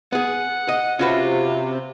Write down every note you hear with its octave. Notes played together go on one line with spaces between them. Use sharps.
B3 G#4 F#5
D#5
C3 C#4 F4 F#4 B4